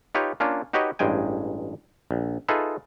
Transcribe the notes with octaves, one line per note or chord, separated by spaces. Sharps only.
D#4 F4 G4 B4 C#5
A#3 C#4 D4 F4
D#4 F#4 G4 B4 C#5 D#5
A1 G2 G#3 G5 G#5
A#1
D#4 F4 G#4 A4 B4 E5